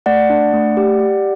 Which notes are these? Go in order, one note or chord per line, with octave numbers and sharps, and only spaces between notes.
A3 D5 F#5
D4
A3
G4
G4